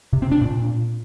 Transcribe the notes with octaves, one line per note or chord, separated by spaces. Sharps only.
C3
C4
D4
A#2